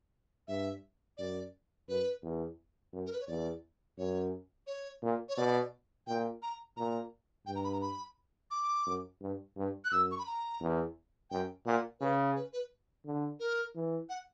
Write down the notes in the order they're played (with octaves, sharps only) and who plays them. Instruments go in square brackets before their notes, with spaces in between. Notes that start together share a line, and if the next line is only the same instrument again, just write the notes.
[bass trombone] G2 [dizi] E5
[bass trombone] F#2 [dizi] D5
[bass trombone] F#2 [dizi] B4
[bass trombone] E2
F#2
[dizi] A#4
B4
C#5
[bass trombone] E2 [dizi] D5
[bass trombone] F#2 [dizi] C#5
[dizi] C#5
[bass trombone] A#2
[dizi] C#5
[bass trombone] B2 [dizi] D5
[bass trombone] A#2 [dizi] G5
[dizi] A#5
[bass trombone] A#2 [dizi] A#5
[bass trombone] G2 [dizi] G5
[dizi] A#5
B5
A#5
B5
D6
[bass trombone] F#2
G2
G2
[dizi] F#6
[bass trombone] F#2 [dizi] E6
[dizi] C#6
B5
A#5
[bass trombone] E2
[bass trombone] F#2 [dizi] G5
[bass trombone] A#2 [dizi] F#5
[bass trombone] C#3 [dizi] B4
[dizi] B4
B4
[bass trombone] D3
[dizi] A#4
[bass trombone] E3
[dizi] F#5